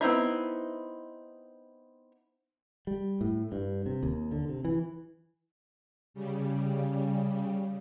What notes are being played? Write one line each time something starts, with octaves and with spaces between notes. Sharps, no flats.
B3 C4 D#4 E4
G3
A2
G2
C3
D#2
D3
C3
E3
C#3 G3